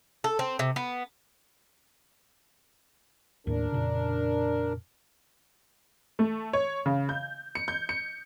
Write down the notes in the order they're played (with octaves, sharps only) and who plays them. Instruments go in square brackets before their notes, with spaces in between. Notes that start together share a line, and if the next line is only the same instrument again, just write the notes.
[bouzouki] A4
C4
C3
B3
[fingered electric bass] D#2 A2 [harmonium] D4 A#4
[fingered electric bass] F2 A#2 C#3
[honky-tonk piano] A3
C#5
C#3
G6
C#7
G6
C#7